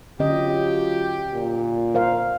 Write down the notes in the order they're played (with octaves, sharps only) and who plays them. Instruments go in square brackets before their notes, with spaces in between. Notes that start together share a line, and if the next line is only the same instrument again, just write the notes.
[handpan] D3 C#4 D#5 [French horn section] F#3 F4 [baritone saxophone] G4
[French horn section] A#2
[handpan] A#4 C5 F5